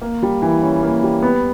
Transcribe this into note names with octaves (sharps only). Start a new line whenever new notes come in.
A#3
G3
E3
C#4
A#3
G3
B3